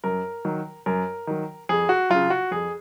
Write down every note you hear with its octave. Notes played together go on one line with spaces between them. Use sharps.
F#2 A#4
D#3 F#3
F#2 A#4
D#3 F#3
F2 G#4
F#4
C#3 F#3 F4
F#4
F2 G#4